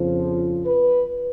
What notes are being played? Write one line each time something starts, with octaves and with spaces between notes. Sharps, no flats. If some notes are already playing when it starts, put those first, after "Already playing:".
Already playing: F2 C#3 F3
B4